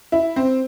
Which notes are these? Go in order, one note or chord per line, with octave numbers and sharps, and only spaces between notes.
E4
C4